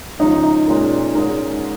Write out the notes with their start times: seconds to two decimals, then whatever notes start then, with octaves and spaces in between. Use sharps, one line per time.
0.19 C#2 C#3 F3 D#4
0.44 D#4
0.67 A#2 G#3 C#4 A#4
1.15 G#2 G#3 C#4 D#4 A#4